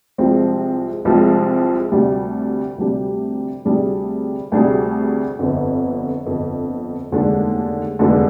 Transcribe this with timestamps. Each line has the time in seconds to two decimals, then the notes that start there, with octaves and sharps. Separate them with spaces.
0.18 C2 C3 F3 G#3 C4
1.05 C2 C3 F3 G#3 C4
1.92 D2 C3 G3 D4 G4
2.78 D2 C3 G3 D4 G4
3.65 D2 C3 G3 D4 G#4
4.52 D2 C3 G3 D4 G#4
5.39 G1 F2 D3
6.25 G1 F2 D3
7.11 F1 D#2 D3 G#3 D4
7.99 F1 D#2 D3 G#3 D4